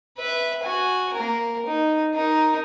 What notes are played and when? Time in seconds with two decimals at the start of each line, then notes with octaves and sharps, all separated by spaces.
0.18 B4 E5
0.63 F#4 G#5
1.13 A#3 A#4
1.66 D#4
2.14 D#4 A#4